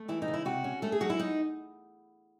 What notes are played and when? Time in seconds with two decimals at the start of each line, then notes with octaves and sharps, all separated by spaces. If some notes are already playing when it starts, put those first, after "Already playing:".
Already playing: A3
0.08 E3 E4
0.22 D#4
0.28 C#3
0.34 E4
0.45 C3 F#4
0.64 C#4
0.82 A3 A4
0.92 G#4
1.01 F#3 F#4
1.10 E4
1.19 D#4